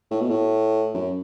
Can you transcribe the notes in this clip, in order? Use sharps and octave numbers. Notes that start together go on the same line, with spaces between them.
A2
B2
A2
F#2